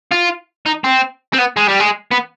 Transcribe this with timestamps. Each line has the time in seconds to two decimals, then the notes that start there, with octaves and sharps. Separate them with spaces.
0.12 F4
0.66 D#4
0.84 C4
1.33 C4
1.39 B3
1.57 G#3
1.68 G3
1.80 G#3
2.11 B3